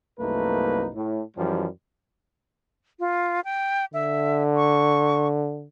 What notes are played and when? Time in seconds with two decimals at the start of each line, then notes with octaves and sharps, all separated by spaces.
0.20 C2 F#2 A3 A#3 D#4 B4
0.95 A2
1.37 F#2 E3 F3 G3
3.00 F4
3.45 G5
3.94 D3 E5
4.56 C#6